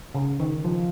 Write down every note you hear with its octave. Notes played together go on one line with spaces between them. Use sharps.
C#3
D#3
F3